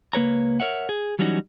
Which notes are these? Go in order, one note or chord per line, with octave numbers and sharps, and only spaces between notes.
C#2 A#3 B4 C#5 A#5
A#4 C#5 E5 F#5
G#4
E3 F#3 G3 C#4 D#4 F#4